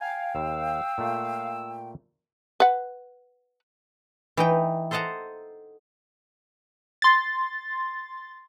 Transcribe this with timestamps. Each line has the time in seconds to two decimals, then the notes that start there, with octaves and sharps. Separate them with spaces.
0.01 F5 G5 G#5
0.35 D#2 E6
0.98 A#2 A3
2.60 B4 F#5
4.37 E3 D#4 G5
4.91 A4 C5 D#5 F#5 A5 A#5
7.02 C6 A6